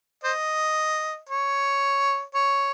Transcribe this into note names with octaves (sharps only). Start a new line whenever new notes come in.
C5 D#5
C#5
C#5